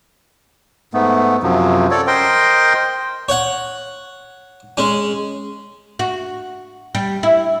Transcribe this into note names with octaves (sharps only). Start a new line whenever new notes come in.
G#2 A3 B3
F#2 C3 F3 F#3
A4 C#5 D5
A#4 C5 D#5 G5 C6
C#5 F#5
G#3 C#4
F#4
G3
E4